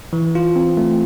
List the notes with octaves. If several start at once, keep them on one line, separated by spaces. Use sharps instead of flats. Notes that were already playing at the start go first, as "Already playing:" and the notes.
E3
F4
C4
A3